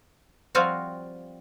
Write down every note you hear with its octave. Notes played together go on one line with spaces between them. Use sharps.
F3 G3 C4 F4 F#4 F5